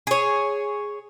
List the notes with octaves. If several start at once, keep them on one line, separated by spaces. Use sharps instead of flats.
G#4 C#5